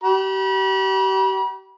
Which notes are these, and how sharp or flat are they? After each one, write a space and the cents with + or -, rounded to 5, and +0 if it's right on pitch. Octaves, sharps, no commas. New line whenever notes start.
G4 -40 B5 -40